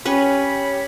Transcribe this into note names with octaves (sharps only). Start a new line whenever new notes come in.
C#4 G4 B4 C#5 B5